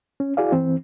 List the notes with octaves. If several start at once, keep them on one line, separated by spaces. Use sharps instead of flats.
C#4
E4 F#4 G#4 D5 F5
E3 C4